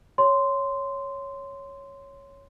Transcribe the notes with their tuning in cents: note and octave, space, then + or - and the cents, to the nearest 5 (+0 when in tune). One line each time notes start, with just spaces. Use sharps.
C#5 +0 C6 -10